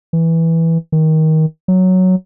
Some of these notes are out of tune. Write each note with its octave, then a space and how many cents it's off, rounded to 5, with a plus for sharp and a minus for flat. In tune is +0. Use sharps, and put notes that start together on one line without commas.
E3 -5
D#3 +20
F#3 +0